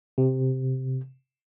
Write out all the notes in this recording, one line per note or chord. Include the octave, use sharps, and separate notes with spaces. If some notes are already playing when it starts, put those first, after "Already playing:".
C3